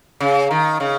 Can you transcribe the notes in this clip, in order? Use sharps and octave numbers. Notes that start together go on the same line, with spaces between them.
C#3
D#3
C#3